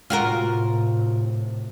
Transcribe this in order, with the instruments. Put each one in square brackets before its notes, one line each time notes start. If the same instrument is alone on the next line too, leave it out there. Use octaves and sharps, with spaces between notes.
[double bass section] A2 C3 [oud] F4 F#4 A#4